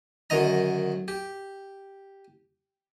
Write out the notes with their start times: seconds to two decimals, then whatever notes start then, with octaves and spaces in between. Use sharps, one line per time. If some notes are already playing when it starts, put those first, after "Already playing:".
0.30 F#2 D3 D#3 D#5 A#5
1.08 G4